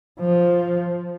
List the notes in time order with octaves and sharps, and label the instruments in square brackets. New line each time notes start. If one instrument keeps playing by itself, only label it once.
[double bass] F3